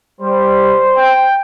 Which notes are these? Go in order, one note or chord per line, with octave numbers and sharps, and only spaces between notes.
G3 C5
G5